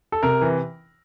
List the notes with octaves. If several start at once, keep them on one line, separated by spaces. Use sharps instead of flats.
A4
C3 A#4
E3